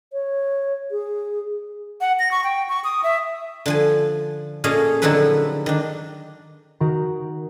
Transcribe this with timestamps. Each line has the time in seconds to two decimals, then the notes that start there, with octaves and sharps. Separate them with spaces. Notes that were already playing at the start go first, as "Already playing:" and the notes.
0.13 C#5
0.91 G#4
2.01 F#5
2.19 A#6
2.31 C#6
2.44 G5
2.69 C#6
2.84 D#6
3.04 E5
3.66 D3 F3 G#5
4.64 A#2 A3 C#4 G#4 D#5 F5
5.02 D3 D#3 F3 F#3 E4 B4
5.66 D#3 D4
6.80 D#3 F#4 A#4